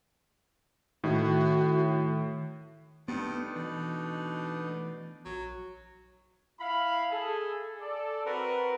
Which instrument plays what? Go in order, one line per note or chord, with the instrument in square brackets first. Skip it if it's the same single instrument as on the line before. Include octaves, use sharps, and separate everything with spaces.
[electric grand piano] A2 [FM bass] D#3 [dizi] F#4
[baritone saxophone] G2 [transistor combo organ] A3 D4 D#4 [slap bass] B3
[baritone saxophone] B2 [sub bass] E3
[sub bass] A#1 [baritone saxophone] F#3
[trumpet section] E4 F5 B5
G#4 A4
A4 D5
C4 F#4 A#4 B4